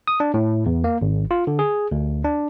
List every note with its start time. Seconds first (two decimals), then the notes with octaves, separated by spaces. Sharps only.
0.07 D#6
0.20 D4
0.34 A2
0.66 E2
0.84 A#3
1.01 G#1
1.31 F4
1.47 D3
1.59 G#4
1.91 D2
2.24 D4